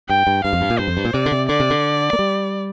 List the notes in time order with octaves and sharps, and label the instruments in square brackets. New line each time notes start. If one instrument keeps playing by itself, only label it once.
[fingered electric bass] G2 [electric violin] G5
[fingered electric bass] G2
[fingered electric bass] G2 [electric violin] F5
[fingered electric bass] F2
G2
A#2
[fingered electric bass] G2 [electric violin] C5
[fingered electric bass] F2
G2
A#2
[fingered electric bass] C3 [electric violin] D5
[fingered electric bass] D3
C3
[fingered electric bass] D3 [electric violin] D5
[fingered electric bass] C3
D3
A#3
G3